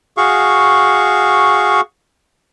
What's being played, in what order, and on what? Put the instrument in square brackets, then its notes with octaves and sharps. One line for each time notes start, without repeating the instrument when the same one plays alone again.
[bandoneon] F#4 G#4 F5 C#6